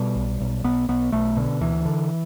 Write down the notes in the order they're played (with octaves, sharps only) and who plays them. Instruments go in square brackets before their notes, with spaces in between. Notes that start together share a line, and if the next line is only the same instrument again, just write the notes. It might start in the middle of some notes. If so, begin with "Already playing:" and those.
Already playing: [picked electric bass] B2 G3
B1
B1
B1 B3
B1 B3
B1 A3
B2 D3
D2 E3
D3